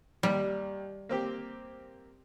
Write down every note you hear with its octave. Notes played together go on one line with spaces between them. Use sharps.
D#2 G3
A#3 C4 G4